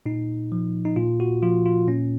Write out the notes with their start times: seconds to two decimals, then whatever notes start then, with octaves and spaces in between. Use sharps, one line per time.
0.06 A#2 D#4
0.52 F3
0.85 D#4
0.96 A#2 F4
1.20 F#4
1.43 F3 F4
1.66 F4
1.88 A#2 C#4